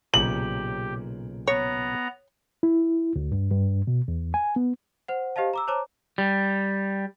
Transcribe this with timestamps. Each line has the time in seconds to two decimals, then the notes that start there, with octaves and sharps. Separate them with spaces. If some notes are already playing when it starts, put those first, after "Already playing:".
0.14 B1 A#2 C#3 G4 F#7
1.47 B3 C#5 A#5
2.63 E4
3.16 D2
3.32 G2
3.52 G2
3.87 B2
4.08 E2
4.34 G#5
4.56 B3
5.08 C5 F#5
5.36 G4 C5 D#5 F5 A5
5.54 A#5 D6 E6
5.68 C5 C#5 A5 A#5 D6
6.18 G3